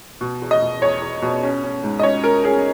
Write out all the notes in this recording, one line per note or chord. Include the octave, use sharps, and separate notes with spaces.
B2
E2
D#5
B2
E2 C#5
E2
B2
C#4
C#4
G#2
D#5
C#4 C#5
C#4 A#4
C#4 G#4